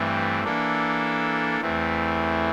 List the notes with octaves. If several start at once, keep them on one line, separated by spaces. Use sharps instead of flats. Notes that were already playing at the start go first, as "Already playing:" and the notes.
Already playing: G2 E3 A3 C4
E3 A#3 D4 A4
E2 E3 A3 C4